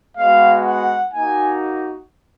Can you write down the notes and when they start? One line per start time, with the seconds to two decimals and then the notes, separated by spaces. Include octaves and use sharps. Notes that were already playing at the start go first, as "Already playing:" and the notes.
0.17 G#3 B3 F#4 F5
0.66 F#5
1.13 A#3 D#4 F#4 G#5